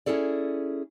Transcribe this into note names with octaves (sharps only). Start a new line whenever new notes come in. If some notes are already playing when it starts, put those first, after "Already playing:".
C#4 E4 G#4 A4 D5